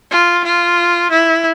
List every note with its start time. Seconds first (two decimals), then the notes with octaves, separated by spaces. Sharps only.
0.11 F4
0.44 F4
1.11 E4